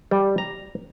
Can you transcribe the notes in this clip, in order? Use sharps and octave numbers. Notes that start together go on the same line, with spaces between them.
G3
A#5